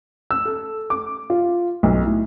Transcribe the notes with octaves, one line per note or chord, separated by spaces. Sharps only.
E6
A4
D6
F4
B1
A2